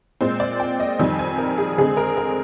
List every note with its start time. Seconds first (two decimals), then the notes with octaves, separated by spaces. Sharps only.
0.21 A#2 G#3 C4 C5
0.40 D5
0.60 G5
0.80 D#5
0.99 F2 D#3 G3 C4 G#5
1.19 G#5
1.38 A#4
1.58 G#4
1.78 D3 G#3 C4 G#4
1.97 A#4
2.17 A#4